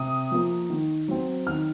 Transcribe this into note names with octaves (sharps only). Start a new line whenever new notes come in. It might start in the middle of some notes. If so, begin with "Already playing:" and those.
Already playing: C3 D#6
F3 A#3
D#3
F#3 C4
D#3 F6